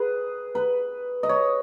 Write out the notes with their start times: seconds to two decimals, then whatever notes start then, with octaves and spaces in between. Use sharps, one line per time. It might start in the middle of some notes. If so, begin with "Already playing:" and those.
Already playing: G#4 B4
0.55 B4
1.23 D#5
1.29 C#5